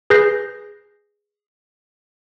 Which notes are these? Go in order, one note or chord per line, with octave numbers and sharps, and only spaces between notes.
G#4 B4 G6 A#6 C7